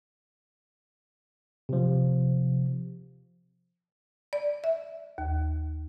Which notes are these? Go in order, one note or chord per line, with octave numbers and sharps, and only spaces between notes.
C3 F3
D5
E5
D#2